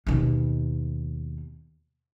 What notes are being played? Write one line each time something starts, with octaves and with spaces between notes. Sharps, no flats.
D#2 B2